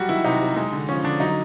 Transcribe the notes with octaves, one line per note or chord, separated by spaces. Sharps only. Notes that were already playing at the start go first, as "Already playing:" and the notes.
Already playing: F#3 G3 F#4
D#3 E4
C3 D#4
C3
G#3
D3
F3 C#4
D3 D4
F#3 D#4